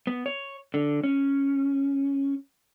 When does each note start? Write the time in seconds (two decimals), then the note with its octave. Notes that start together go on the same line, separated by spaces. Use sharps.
0.07 B3
0.26 C#5
0.74 D3
1.04 C#4